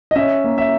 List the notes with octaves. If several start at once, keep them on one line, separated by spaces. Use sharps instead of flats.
D#5
C#4 E5
A#3
E5